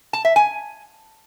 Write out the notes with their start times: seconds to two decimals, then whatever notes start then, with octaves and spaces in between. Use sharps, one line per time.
0.13 A5
0.25 E5
0.36 G#5